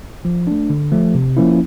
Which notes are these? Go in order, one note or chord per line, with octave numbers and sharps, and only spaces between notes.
F3
A3 D4
D3
F3 A3
C3
F3 A#3 C#4 E4